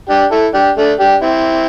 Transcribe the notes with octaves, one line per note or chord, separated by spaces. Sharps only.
D4 G4
E4 A4
D4 G4
A3 D4
D4 G4
C4 E4